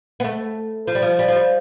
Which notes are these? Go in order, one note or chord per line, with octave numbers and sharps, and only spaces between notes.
B3
A3
F3
G3
F3
G3
F3
G3